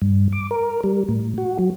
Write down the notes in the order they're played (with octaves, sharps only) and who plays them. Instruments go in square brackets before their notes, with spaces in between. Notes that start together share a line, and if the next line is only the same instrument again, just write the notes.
[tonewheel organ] G2
D6
A#4
G3
A2
F#4
F#3